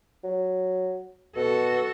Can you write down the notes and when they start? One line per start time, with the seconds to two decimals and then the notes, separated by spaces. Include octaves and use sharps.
0.24 F#3
1.36 B2 F#4 A4